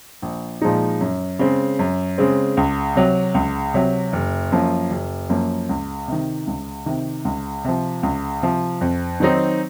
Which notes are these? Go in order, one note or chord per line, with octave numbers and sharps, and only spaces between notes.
A#1
A#2 F3 G#3 D#4
F#2
C#3 G#3 C4
F#2
C#3 G#3 C4
C#2
C3 F#3
C#2
C3 F#3
F#1
F#2 F3 A#3
F#1
F#2 F3 A#3
C#2
C3 D#3
C#2
C3 D#3
C#2
C3 F3
C#2
C3 F3
F2
D#3 F#3 C4 D#4